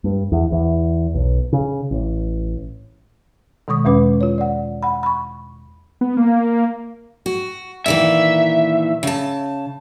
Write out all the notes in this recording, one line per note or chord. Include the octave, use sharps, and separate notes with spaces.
G2
E2
E2
B1
C#3
A1
B2 D#3 G#3 C#6 D#6
E2 B2 G#3 C#4 B4 D6
F4 C#5
D5 F#5
F#5 B5
B5 C#6
B3
A#3
F#4
A#2 D#3 E3 E5
C#3 A5